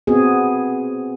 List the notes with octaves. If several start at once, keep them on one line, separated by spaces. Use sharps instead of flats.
B3 C4 F#4 G#4